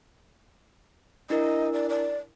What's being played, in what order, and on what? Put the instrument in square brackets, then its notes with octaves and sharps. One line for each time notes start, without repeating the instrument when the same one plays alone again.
[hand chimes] D4 E4 A#4 [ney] D#5
[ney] D5
D5